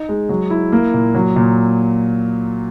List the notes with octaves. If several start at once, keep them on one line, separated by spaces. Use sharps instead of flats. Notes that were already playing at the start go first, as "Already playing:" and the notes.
Already playing: D#4
G#3
F#3
E4
A#3
A#2
F#3
A#2